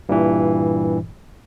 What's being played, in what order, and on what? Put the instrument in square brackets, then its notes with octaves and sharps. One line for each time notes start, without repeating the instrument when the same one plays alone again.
[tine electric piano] G2 A#2 E3